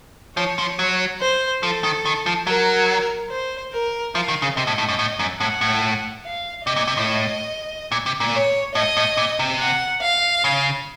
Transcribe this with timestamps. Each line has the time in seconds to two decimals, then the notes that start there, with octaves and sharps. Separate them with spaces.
0.37 F3 C#5
0.59 F3
0.79 F#3
1.20 C5
1.63 F3 A4
1.84 D#3
2.05 D#3
2.26 F3
2.47 F#3 A#4
3.30 C5
3.72 A#4
4.14 F3 F5
4.28 D#3
4.42 C#3
4.57 C3 D#5
4.67 A2
4.78 A2
4.89 F#2
4.99 A2
5.19 F#2
5.40 A2 F#5
5.61 A2
6.24 F5
6.66 C3 D#5
6.76 A#2
6.87 C3
6.97 A2
7.92 A#2
8.06 C3
8.20 A#2
8.34 C#5
8.75 A2 D#5
8.97 A2
9.17 A#2
9.39 C3
9.60 F#5
10.02 F5
10.44 C#3